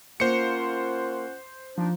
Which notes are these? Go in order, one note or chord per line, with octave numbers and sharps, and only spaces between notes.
A#3 C#4 F4 C5 F#5 C#7
F3 A#3 D4 D#4